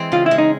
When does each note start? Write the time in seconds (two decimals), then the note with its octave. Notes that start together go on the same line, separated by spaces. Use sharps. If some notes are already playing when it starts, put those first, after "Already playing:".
Already playing: E3 G#3 C4
0.12 C#3 F4
0.26 E4
0.31 G#3
0.38 D#4